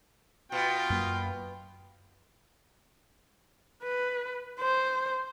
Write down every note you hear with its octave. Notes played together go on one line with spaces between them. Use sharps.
B2 F4 G5
F#2 A#3
B4
C5